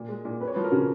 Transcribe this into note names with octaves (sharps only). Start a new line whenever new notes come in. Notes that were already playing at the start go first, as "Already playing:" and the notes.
Already playing: A#2
G#3
A#2
F2 B4
C#5
F3 B4
A#4
C#3